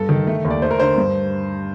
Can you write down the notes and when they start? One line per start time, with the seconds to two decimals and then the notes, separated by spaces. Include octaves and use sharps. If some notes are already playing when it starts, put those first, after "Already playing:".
Already playing: G2 A4
0.09 D#3
0.27 A3
0.45 D#2
0.50 D5
0.62 A3 C5
0.71 A#4
0.80 D3 C5
0.97 G2